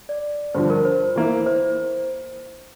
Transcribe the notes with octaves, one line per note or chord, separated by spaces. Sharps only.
D5
G2 D3 F3 C5
A#4
C5
E3 A#3 E4
C5